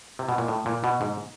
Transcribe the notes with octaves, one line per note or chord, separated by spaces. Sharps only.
C3
B2
A#2
A2
A#2
B2
G#2